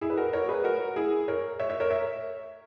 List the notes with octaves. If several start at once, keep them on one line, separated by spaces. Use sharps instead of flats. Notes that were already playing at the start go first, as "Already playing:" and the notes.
E4 G#4
B4
F#4 A#4
A#4 C#5
G#4 B4
F#4 A#4
E4 G#4
A#4 C#5
C#5 E5
C#5 E5
A#4 C#5
C#5 E5